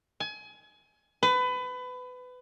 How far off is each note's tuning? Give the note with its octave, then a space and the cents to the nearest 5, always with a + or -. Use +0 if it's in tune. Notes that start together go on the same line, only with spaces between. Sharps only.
G#5 +30
B4 +25